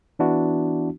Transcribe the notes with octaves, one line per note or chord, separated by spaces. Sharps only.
E3 B3 D4 E4 F#4